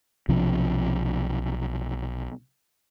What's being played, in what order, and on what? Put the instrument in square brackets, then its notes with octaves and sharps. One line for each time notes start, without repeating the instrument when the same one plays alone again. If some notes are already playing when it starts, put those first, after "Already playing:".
[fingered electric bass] B1 C3 F3 D4